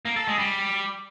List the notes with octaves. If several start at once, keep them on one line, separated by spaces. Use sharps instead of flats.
A#3
A4
G#3
G3